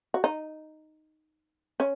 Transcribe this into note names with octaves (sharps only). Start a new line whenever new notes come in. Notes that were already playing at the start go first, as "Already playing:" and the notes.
F#4
D#4
C#4